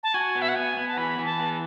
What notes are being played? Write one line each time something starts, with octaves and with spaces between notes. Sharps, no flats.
A5
F#4 G#5
B3
E5
F#5
B3 G#5
B3
A5
E3 B5
E3
A5
B3